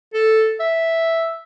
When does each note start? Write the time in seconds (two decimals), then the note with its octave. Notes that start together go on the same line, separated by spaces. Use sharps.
0.14 A4
0.60 E5